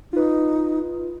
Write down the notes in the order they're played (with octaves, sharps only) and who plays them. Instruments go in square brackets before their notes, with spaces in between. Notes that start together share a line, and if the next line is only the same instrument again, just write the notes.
[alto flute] D#4 [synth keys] F4 B4